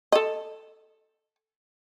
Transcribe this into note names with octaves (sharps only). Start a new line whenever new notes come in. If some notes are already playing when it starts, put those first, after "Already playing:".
A4 D#5